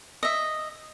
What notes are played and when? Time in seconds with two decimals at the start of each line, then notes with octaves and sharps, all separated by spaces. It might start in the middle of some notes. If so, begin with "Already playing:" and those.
0.23 D#5 E5